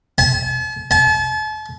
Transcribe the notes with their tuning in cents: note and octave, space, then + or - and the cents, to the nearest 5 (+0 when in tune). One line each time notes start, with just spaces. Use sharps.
A5 -45
A5 -40